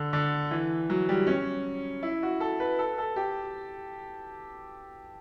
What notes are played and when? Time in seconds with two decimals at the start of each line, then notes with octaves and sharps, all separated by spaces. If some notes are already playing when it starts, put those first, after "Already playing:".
Already playing: D3
0.13 D3
0.51 E3
0.90 F#3
1.09 G3
1.27 C#4
2.03 E4
2.23 F#4
2.40 A4
2.60 B4
2.79 A4
2.98 A4
3.16 G4